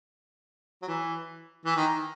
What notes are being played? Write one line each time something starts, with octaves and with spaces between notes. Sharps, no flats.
F#3
E3
E3
D#3